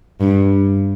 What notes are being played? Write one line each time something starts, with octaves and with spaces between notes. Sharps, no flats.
G2